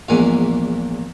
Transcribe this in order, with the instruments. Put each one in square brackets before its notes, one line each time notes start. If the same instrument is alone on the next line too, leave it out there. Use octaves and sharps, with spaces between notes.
[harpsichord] A#1 E2 G#2 A#3 F#5 G#5